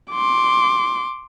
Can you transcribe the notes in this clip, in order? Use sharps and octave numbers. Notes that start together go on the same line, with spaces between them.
C6 D6